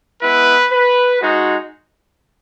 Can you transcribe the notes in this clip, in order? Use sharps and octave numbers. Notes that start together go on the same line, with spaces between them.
G#3 B3 E4 B4
B4
G#3 D#4 F#4